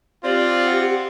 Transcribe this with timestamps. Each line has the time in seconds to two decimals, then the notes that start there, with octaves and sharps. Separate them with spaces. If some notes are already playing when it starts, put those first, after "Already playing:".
0.24 C4 F4 G4 D5
0.66 F#5